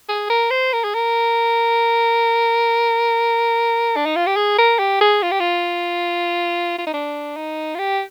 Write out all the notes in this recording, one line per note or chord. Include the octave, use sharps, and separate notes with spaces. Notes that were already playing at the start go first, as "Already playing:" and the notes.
G#4
A#4
C5
A#4
G#4
A#4
D4
D#4
F4
G4
G#4
A#4
G4
G#4
F4
G4
F4
F4
D#4
D4
D#4
F4
G4